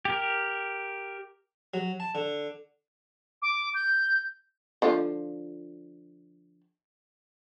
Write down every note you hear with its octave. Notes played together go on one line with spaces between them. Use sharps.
G4 A#4
F#3
A5
D3
D6
G6
D3 F3 F4